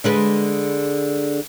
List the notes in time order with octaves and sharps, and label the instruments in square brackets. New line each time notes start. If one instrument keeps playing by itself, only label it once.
[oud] D3 G#3 B4